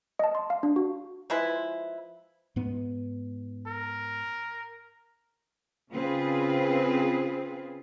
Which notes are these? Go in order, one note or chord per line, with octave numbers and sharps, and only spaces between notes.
D#5 A5
C6
F5
D4
F#4
F3 G#3 E4 B4
G#2 B3
A#4
C#3 C4 F4 G#4 B4